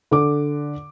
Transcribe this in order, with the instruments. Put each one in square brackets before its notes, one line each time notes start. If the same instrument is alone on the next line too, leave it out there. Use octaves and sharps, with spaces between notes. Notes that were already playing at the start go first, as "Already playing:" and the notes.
[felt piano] D3 D6